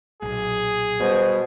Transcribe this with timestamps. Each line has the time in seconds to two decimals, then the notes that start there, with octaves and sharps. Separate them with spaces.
0.22 B1 A#2 G#4
1.00 B2 G3 C5